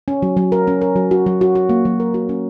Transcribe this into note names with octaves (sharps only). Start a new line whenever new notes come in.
C#4
F#3
F#3
A#4
C#4
A#4
F#3
F#4
F#3
F#4
F#4
A#3
F#3
A#4
F#4
C#4